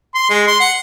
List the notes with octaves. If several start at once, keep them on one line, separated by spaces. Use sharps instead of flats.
C6
G#3
C6
F#5